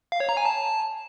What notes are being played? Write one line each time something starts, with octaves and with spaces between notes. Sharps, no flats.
F5
C#5
A#5
G#5
A5